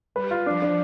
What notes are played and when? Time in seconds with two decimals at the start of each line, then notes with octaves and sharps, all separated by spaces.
0.15 G3 B4
0.31 F4
0.46 F3 D4
0.62 D4